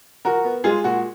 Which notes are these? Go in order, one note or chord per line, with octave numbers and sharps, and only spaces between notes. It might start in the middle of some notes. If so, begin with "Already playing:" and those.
F3 F#4 A#4
B3
G#3 F4 G#4
A#2 F#4